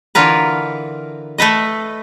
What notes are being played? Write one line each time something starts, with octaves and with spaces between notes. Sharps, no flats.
D3 E3 F4 A#4 B4
A3 A4 B4 D#5